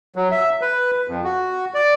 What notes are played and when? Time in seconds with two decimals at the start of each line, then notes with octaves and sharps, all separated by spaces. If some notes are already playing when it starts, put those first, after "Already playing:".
0.16 F#3
0.31 E5
0.61 B4
1.08 F2
1.24 F#4
1.74 D5